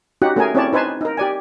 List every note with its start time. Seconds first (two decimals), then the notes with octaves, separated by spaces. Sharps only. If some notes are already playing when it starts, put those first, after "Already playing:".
0.22 C#4 D#4 F#4 G4 F#5
0.36 A3 C#4 G#4 A#4 G#5
0.55 C4 C#4 E4 C#5 D5 A5
0.73 D#4 B4 C5 G#5 A5
1.01 D#4 A#4
1.17 G4 D5 G#5